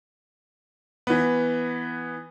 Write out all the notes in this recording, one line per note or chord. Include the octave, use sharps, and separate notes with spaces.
E3 B3